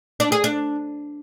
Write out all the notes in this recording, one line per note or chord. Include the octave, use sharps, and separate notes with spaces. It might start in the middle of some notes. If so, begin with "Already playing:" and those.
D4
G#4
D4